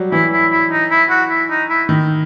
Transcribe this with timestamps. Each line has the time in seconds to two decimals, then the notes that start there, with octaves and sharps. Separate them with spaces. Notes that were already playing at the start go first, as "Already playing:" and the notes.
Already playing: F#3 G3
0.12 E3 E4
0.32 E4
0.51 E4
0.71 D#4
0.91 E4
1.10 F#4
1.30 E4
1.50 D#4
1.70 E4
1.89 D#3